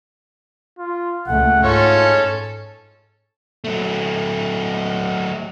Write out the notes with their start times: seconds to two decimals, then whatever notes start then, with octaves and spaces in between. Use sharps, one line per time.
0.79 F4
1.28 C#2 A3 F#5
1.63 G#2 C#4 F4 A4 C#5
3.64 F#3 A3